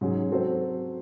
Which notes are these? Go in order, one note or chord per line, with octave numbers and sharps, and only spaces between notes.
G#2 F#3 C#4 G#4
F#3 C4 F#4 A4 C5